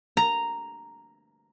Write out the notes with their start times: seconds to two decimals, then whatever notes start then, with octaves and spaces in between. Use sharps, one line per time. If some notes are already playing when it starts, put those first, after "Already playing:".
0.17 A#5